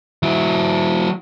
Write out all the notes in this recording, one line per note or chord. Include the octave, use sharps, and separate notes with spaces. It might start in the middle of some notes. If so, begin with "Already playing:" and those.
F#3 E4